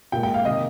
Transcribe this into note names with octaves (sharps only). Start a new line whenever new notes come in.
A#2 G#3 G5
G5
F5
C3 D#3 A#3 D#5